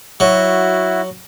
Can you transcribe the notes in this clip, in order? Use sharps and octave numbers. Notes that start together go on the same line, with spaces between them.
F#3 E4 F#4